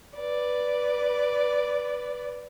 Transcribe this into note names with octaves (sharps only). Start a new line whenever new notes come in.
B4 D5